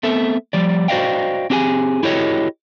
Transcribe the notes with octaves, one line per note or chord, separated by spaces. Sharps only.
A3 B3 C4 A4 E5
F3 G3 D5
F#4 C5 D5 D#5 F5 G5
C4 D4 G4 G#4 G#5
E4 F#4 G4 A4 C#5 D#5